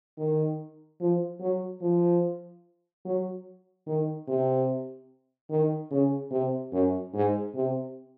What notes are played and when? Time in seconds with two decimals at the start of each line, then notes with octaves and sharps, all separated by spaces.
0.18 D#3
1.00 F3
1.40 F#3
1.81 F3
3.05 F#3
3.86 D#3
4.27 C3
5.50 D#3
5.91 C#3
6.31 C3
6.72 F#2
7.13 G#2
7.54 C3